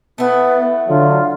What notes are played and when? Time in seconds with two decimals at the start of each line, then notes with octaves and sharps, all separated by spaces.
0.18 A3 B3 E4
0.88 D3 F#3 F4